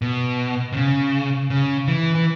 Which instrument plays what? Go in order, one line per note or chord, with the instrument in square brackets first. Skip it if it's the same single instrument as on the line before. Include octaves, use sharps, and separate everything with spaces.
[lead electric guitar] B2
C3
C#3
C#3
E3
E3